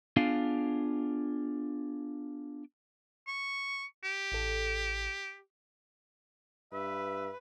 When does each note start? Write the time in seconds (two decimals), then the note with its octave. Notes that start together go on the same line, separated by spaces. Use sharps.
0.17 B3 D4 F4 G#4 F5
3.27 C#6
4.04 G4
4.32 A1 A4
6.73 G2 B4 E5